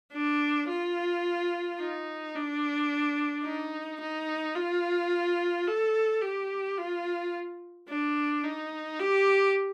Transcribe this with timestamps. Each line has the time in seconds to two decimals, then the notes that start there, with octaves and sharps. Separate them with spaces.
0.13 D4
0.69 F4
1.79 D#4
2.35 D4
3.45 D#4
4.01 D#4
4.55 F4
5.67 A4
6.22 G4
6.78 F4
7.89 D4
8.44 D#4
9.00 G4